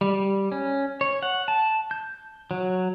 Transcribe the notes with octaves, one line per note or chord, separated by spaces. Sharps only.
G3
C#4
C#5
F#5
A5
G6
F#3